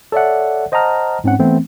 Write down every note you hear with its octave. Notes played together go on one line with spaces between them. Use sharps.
A4 C#5 D5 E5 F#5
C5 D#5 F#5 A5 A#5 F6
G#2 C4 C#4 F#5
E3 A3 B3 C4